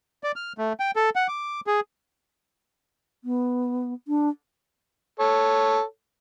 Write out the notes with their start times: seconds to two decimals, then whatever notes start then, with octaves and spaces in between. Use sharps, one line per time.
0.24 D5
0.36 F6
0.58 A3
0.80 G5
0.96 A4
1.16 F#5
1.28 D6
1.67 G#4
3.24 B3
4.08 D4
5.20 A4 C#5